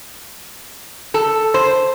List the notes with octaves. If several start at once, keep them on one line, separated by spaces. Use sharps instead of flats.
A4
C5